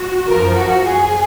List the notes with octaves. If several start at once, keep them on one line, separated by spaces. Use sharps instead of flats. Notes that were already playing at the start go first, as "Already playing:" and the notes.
Already playing: F#4
F#2 F3 A#4
F#4
G#4